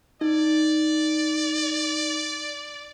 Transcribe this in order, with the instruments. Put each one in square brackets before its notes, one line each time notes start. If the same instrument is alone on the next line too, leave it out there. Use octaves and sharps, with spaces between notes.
[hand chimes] D#4 [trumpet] D5